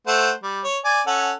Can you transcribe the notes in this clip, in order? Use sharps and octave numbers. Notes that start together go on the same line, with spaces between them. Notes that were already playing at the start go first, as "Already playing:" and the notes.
A3 C5 F#5
G3
C#5
D5 G#5
C#4 A4 F#5